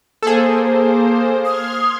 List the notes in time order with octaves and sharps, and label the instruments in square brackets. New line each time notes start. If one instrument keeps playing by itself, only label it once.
[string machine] A#3 C5 [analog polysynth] G#4 A4
[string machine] C6 F6 G#6 [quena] D#6